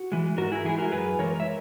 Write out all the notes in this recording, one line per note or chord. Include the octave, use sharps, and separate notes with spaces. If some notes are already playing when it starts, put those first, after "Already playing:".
Already playing: F#4
E3 G#3
G#2 F#4 A#4
E4 G#4
E3 G#3 E4 G#4
F#4 A#4
F#2 G#4 B4
E3 G#3 A#4 C#5
E5